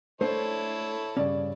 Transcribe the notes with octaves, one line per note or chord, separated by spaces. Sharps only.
A3 D4 E4 A4 C5 C#5
G2 C#3 C#4 D5